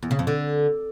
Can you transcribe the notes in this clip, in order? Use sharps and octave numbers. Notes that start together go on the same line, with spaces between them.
E2
C#3
F2
D3